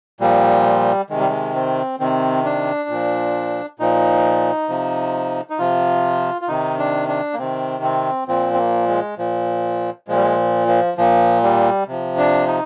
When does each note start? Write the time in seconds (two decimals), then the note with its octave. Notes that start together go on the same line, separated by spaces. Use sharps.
0.21 A#2 F3 G3
1.10 C3 D#3 G#3
1.20 G3
1.29 G#3
1.55 C4
2.00 C3 D#3 C4
2.45 D4
2.89 A#2 F3
3.79 A#2 F3 D#4
4.69 C3 F3
5.50 D#4
5.59 C3 F3 F4
6.41 F4
6.48 C3 D#3 D#4
6.79 D4
7.08 D4
7.34 A#3
7.38 C3 D#3 C4
7.83 C4
8.28 A#2 F3 C4
8.53 C4
8.58 A#3
8.88 G#3
9.18 A#2 F3
10.08 A#2 F3 G#3
10.16 G3
10.22 G#3
10.68 F3
10.98 A#2 F3
11.43 G3
11.88 C3 F3
12.18 D4
12.47 D#4